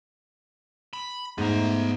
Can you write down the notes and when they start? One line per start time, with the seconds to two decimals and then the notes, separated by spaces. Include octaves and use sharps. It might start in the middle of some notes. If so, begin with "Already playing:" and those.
0.93 B5
1.38 G#2 A3 B3 A#5